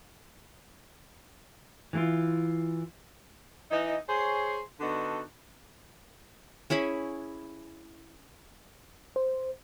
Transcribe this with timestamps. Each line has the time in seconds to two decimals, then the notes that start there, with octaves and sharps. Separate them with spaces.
1.93 E3 G3 A#3 E4 F4
3.70 E3 D#4 D#5
4.08 G#4 C5 C#5
4.80 D3 B3 D4 D#4 F#4 A4
6.70 C#4 E4 G#4 B5
9.16 C5